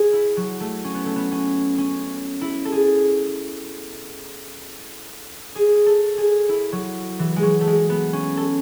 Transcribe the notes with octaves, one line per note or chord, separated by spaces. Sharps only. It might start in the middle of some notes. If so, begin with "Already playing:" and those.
Already playing: G#4
E4
F#3
A3
C#4
B3
A3
B3
C#4
C#4
E4
A4
G#4
G#4
A4
G#4
E4
F#3
E3
G#3
F#3
A3
G#3
B3
C#4
A4